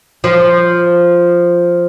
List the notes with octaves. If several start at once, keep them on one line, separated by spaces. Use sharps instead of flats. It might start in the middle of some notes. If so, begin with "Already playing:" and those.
F3